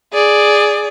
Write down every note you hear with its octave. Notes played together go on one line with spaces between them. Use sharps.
G#4 D5